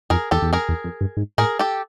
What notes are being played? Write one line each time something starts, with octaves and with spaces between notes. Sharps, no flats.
F2 G#4 A#4
E2 G4 A4
E2
F2 G#4 A#4
E2
F2
G2
G#2
A2 G#4 A#4
G4 A4